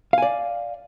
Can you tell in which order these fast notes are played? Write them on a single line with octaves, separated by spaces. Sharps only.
F5 G#5 D5